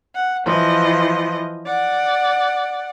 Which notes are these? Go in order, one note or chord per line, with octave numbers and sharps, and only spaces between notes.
F#5
E3 F3 D#5
D5 F#5